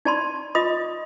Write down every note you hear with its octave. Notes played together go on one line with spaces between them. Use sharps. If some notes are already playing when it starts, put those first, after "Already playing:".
D#4 D5 A5 B5 C6
F4 D#5 B5 D#6